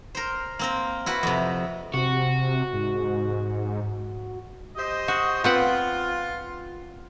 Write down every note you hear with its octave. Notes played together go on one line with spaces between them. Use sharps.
A#4 C5
A#3 C4 A#4
E4 F#4 B4
F2 C3
C3 F#4
G#2
G4 C5 D#5
F#4
B3 C4 F4 F#5